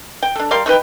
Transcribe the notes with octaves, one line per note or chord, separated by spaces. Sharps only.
G5
D4 A4
G3 A#4 F5 C6
A3 D#4 B4 G5